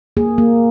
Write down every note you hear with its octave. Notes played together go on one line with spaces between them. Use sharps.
A#3 G#4
A#3